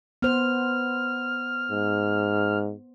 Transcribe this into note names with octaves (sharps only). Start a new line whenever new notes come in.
B3 C5 F6
G#2